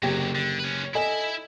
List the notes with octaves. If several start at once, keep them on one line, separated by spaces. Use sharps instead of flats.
F#1 C3 F#3 G4 G#6
D3
C#4 B4
E4 A4 D#5 E5 G#5